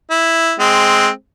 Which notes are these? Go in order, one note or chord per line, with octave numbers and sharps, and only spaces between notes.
E4
G#3 C4